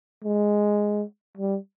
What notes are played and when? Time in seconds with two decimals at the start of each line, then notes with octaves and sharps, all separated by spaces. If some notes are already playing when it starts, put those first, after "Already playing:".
0.24 G#3
1.37 G3